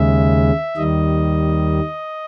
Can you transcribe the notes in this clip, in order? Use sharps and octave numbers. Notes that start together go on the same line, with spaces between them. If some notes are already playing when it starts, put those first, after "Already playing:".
Already playing: D#2 C#3 G#3 E5
D#2 D#3 G3 D#5